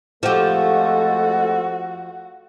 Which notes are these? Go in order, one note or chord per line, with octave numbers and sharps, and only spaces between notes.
F2 F3 G#3 A3 F#4 G4 A4